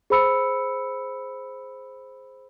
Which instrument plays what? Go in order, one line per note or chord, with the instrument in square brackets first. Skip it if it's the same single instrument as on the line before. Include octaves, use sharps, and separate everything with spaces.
[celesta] G#4 C5 B5 E6 C#7